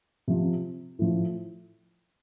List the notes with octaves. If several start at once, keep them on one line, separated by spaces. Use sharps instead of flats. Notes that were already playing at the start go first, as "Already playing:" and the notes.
C3 F3
A2 F3